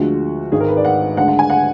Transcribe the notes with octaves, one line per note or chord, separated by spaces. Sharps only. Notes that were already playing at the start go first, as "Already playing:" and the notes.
Already playing: D2 D3 F3 G#3 F#4
G#1 G#2 D#3 G#4
A#4
B4
D5
F#5
D2 D3 G#3 F#5
F#5
G#5
F#5